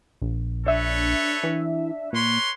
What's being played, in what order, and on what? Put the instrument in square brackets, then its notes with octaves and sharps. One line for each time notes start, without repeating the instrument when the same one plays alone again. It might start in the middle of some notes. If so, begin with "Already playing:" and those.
[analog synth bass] A#1
[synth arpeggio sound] D4 E5 [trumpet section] A4 B4 C#5
[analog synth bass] E3
[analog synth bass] A#2 [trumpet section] B4 C#5 C6